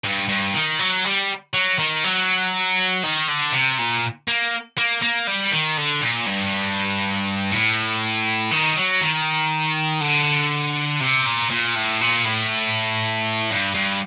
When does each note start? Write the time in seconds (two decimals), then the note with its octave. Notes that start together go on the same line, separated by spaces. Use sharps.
0.04 G2
0.29 G2
0.54 D#3
0.79 F#3
1.04 G3
1.54 F#3
1.79 D#3
2.04 F#3
3.03 D#3
3.28 D3
3.53 C3
3.78 A#2
4.28 A#3
4.78 A#3
5.02 A#3
5.27 G3
5.52 D#3
5.77 D3
6.02 A#2
6.27 G2
7.52 A2
8.51 D#3
8.76 F#3
9.01 D#3
10.01 D3
11.01 C3
11.26 A#2
11.51 A#2
11.76 A2
12.01 A#2
12.25 A2
13.50 G2
13.75 G2